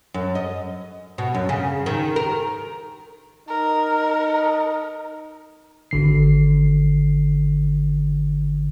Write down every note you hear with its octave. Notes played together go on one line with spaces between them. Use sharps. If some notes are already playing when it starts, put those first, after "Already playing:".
F#2
D#5
B2
F#2
C#3
D#3
A#4
D#4 A#4
G#1 D3 C7